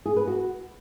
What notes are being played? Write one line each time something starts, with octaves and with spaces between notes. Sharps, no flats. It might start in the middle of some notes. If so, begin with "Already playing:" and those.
G#4
B4
F#4